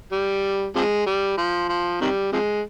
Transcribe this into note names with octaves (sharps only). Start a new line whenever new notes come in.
G3
C3 F3 G#3
G3
F3
F3
C3 D#3 G3
C3 F3 G#3